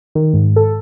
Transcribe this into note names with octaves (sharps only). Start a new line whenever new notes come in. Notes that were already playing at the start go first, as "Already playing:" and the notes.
D#3
G#2
A4